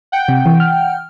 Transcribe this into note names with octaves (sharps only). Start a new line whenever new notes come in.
F#5 G5 G6
C3
E3
F6